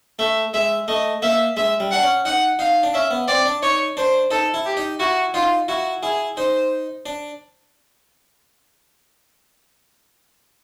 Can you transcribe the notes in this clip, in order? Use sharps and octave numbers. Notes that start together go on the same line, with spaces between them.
A3 E5
G#3 E5
A3 D#5
A#3 E5
G#3 E5
G3
D4 F#5
C#4
D#4 F#5
D#4 F5
D4
C#4 E5
B3
C4 D5
D4
D#4 C#5
D4 C5
D#4 A4
E4
G4
D#4
E4 F#4
D#4 F4
E4 F#4
E4 G#4
D#4 C5
D4